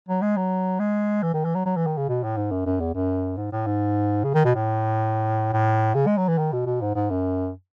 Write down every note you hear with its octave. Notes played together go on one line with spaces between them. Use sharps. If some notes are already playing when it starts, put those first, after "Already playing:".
F#3
G#3
F#3
G#3
E3
D#3
E3
F#3
F#3
E3
D#3
C#3
B2
A2
G#2
F#2
F#2
E2
F#2
G#2
A2
G#2
C#3
D#3
B2
A2
A2
C#3
G#3
F#3
E3
D#3
B2
B2
G#2
G#2
F#2